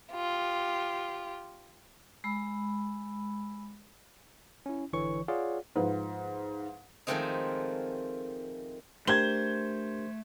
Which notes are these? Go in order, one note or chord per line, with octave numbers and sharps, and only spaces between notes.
F4 G4
G#3 B5 E6
C#4 E4
G#1 D3 E3 C#5 C#6
F4 G#4 C#5 D5 F5 F#5
G#2 F3 B4
D#3 F3 G#3 A3 C4 D#4
A3 D4 G4 A#4 C5 G#6 G7